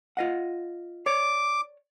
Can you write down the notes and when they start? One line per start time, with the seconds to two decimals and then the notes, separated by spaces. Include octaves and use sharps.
0.17 F4 D#5 F#5
1.06 C#5 D5 D6